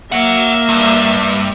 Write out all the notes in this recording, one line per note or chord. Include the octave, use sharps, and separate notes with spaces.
A#3 C#5 E5 F#5
G2